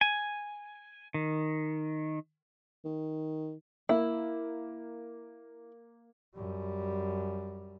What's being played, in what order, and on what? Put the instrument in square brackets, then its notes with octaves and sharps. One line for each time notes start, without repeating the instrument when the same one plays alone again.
[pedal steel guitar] G#5
D#3
[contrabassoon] D#3
[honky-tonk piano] A#3 [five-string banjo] E4
[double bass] F#2 G3